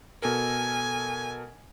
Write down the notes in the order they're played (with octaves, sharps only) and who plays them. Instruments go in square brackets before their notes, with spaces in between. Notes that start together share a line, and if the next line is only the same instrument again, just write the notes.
[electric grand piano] B2 A4 A#4 [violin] G#5